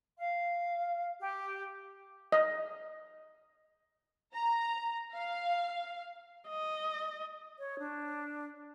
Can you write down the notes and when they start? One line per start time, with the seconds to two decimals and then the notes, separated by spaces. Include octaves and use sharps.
0.18 F5
1.20 G4
2.32 D#5
4.33 A#5
5.13 F5
6.48 D#5
7.59 C#5
7.79 D4